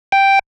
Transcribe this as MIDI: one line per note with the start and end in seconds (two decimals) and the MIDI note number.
0.12 0.39 79